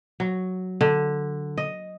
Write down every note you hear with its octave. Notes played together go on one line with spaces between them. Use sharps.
F#3
D3
D#5